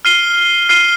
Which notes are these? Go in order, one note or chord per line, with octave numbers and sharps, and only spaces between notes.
F6 C7 D#7 G7
F6 C7 D#7 G7